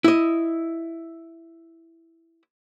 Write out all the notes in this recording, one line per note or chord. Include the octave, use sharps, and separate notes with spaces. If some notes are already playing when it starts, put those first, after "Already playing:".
E4 D#5